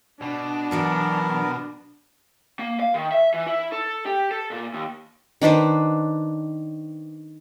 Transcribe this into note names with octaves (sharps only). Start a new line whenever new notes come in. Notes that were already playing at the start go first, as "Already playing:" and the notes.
B2 D4
E3 F#3 B3 F#4 A#4
A#3
F5
D#3
E5
E3
E4
A4
G4
A4
A#2
D#2
D#3 D4 B4 C5